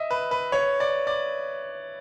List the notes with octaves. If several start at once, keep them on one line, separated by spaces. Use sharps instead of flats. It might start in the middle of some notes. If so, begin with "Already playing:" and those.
Already playing: D#5 E5
B4
B4
C#5
D5
D5